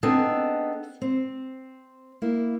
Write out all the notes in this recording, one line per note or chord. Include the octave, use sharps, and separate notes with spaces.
B3 C4 D4 D#4 G#4 A4
C4
A#3 E4